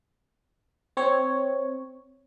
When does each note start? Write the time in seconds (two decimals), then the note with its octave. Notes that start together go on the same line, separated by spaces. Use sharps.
0.97 C4 C#5